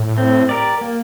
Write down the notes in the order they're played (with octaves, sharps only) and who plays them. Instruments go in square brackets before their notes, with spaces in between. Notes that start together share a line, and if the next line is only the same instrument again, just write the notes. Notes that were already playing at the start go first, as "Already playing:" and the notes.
Already playing: [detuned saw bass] A2
[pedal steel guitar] C4
G4 A#4 D5
A#3